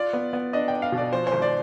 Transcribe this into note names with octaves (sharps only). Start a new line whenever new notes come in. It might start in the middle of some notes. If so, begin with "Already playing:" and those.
Already playing: F4 D5
B3
B3
D4 D#5
G5
D4
F5
B2
D5
F3 C5
C5
G#1
D5